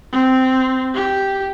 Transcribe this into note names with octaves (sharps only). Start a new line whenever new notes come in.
C4
G4